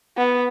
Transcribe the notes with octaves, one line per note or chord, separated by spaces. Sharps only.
B3